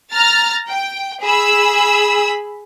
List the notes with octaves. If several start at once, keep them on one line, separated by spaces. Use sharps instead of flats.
A#5 F6 A6
G5
G#4 B5 E6